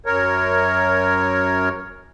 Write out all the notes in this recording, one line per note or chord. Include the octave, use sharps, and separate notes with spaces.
F#2 A#4 C#5